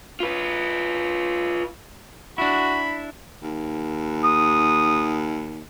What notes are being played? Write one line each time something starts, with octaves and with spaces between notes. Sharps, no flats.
F4 B4
D4 E4 F#4 B5
D#2
D#6